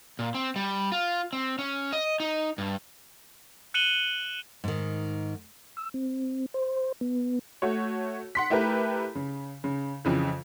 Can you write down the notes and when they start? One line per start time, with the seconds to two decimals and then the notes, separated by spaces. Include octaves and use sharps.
0.19 A#2
0.34 C4
0.56 G3
0.92 F4
1.33 C4
1.59 C#4
1.93 D#5
2.20 D#4
2.58 G2
3.74 F#6 C#7 D#7 E7 F#7 G7
4.64 G#2 D#3
5.77 E6
5.94 C4
6.54 C5
7.01 B3
7.62 A3 F#4 C#5
8.35 F#5 C6 B6
8.50 A3 E4 G4 A#4 B4
9.15 C#3
9.64 C#3
10.05 F2 C#3 E3